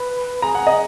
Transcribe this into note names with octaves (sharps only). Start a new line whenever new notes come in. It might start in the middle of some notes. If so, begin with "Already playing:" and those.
Already playing: B4
G#4 A#5
F#5
D#5